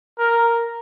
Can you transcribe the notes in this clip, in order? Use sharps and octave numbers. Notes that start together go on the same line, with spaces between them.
A#4